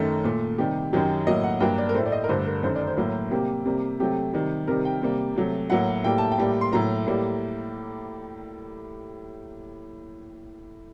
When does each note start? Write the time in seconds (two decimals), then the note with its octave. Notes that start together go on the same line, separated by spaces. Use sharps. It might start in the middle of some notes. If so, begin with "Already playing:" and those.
Already playing: F#2 D#3 A3
0.24 A#2 A3
0.58 C3 D#3 G3 G4
0.93 F#2 D#3 F#3 G4
1.27 A2 F#3 A#3 D#5
1.43 F#5
1.60 G2 F#3 A#3 G5
1.78 D5
1.89 A#4
1.95 A2 A3 C5
2.06 D5
2.12 D#5
2.24 A#4
2.29 G2 D3 A3 C5
2.46 A#4
2.63 F#2 D#3 A3 C5
2.75 D5
2.87 C5
2.97 A2 F#3 A#3
3.31 C3 G3 A#3 G4
3.66 C3 G3 A#3
4.00 C3 F#3 A3 G4
4.33 C3 D#3 G3
4.67 C3 D#3 G3 A#4
4.85 G5
5.02 C3 G3 A#3
5.36 C3 F#3 A3
5.70 A2 F#3 A#3 F#5
6.04 A2 G3 A#3 G5
6.18 A5
6.32 G5
6.38 A2 G3 A#3
6.61 C6
6.72 A2 F#3 A#3 A#5
7.07 A2 G3 A#3